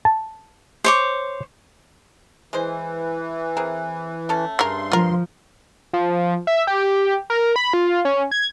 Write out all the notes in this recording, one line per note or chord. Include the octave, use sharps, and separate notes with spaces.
A5
C5 C#5 D6
E3 G#3 G#4 C5
C4 G#4 A#4
A3 C#4 A4
G2 C#3 A#4 C6
F3 F4 A#4
F3
E5
G4
A#4
B5
F4
C#4
G#6